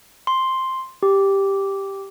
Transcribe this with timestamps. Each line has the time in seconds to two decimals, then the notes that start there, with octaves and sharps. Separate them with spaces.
0.27 C6
1.03 G4